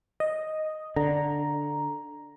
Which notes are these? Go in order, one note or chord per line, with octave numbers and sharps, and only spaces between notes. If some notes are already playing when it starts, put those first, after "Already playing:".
D#5
D3 A#5